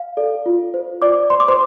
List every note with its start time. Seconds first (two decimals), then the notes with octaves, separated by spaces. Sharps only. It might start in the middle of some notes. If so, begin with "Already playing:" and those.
Already playing: F5
0.17 A4 D5
0.46 F4
0.74 C5
1.02 F4 D5 D6
1.30 C5 C6
1.40 D6
1.48 C5 C6